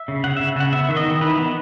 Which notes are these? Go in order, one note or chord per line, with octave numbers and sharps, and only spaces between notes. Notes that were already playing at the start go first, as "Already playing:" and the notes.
Already playing: E5
C#3
C#3 F#5
C#3 E5
C#3 F#5
B3 E5
D#3 E5
D#5
D#3
E3 B4
B3